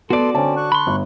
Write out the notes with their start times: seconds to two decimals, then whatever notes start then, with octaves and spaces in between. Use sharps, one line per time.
0.10 B3 F#4 A4 D5 C6 D7
0.34 D3 C4 C#4 A5
0.57 C#6 F#6
0.72 B5 C6
0.87 G1